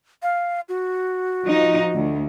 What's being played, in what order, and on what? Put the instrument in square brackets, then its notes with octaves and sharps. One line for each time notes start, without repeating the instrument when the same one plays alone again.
[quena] F5
F#4
[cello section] F3 D#4
D2